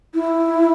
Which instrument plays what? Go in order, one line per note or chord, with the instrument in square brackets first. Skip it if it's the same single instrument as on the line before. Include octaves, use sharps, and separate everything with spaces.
[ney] E4